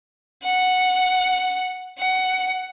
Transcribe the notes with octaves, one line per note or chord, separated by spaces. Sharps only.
F#5
F#5